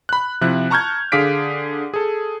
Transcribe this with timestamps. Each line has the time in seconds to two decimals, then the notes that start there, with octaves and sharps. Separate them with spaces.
0.09 B5 F#6
0.41 C3 F3 E4 F#6
0.70 A5 A#5 C#6 F6 G6 G#6
1.12 D3 G#4 F5 D6 B6 D7
1.94 G#4 A4